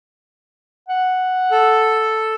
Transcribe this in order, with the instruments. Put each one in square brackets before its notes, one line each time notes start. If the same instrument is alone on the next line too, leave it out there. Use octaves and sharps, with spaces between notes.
[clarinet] F#5
[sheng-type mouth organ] A4